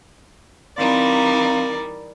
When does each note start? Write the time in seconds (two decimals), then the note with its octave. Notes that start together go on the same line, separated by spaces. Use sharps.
0.77 E3 G3 C4 D#4 A#4 D5 F5 C6